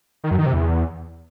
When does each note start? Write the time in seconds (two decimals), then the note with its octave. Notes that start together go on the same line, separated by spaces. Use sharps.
0.24 D#3
0.31 F#2
0.39 D#3
0.46 C3
0.54 E2